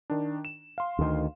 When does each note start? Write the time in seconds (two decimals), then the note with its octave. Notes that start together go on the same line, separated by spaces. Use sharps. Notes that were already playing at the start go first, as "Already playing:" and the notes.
0.10 D#3 D4
0.45 E7
0.78 F5 C6
0.99 D2 D#3